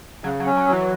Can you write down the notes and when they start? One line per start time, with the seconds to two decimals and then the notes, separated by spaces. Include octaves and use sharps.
0.24 C#3 F#3
0.40 F#3
0.46 C#4
0.57 F#3
0.67 F#3
0.72 E3